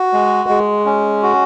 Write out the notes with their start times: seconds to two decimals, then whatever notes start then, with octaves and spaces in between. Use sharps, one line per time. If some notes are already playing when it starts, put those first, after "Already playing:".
Already playing: F#4
0.13 G#3
0.49 G#3
0.86 C#4
1.23 F#4